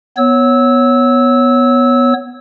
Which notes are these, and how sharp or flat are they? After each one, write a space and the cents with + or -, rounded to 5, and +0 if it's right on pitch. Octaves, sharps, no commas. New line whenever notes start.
B3 +0 C#5 -5 E6 -20